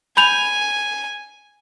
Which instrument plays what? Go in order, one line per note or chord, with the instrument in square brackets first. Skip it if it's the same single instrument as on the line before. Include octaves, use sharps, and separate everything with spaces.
[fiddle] G#5 [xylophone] B5 G6 F7